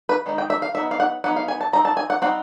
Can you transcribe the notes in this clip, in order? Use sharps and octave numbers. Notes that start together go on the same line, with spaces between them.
B4
D#3 G#3 D#4
G5
E5
F5
F#3 B3 D#4 E5
F5
F#5
F#3 B3 D#4 F#5
F5
G#5
A5
G3 C4 D#4 A#5
A5
G#5
F#5
G3 C4 D#4 F#5